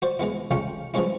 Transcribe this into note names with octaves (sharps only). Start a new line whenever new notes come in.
F#4 C5 D5
E3 G#3 B3 E4
G#3 A3 C#4 F4 G5 B5
E3 F3 G3 G#3 C#4 E4